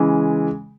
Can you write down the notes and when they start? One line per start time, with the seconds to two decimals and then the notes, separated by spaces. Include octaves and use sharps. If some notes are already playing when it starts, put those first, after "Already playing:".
Already playing: C#3 E3 G#3